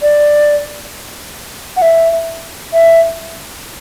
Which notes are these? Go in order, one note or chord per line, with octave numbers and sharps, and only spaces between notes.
D5
F#5
E5
E5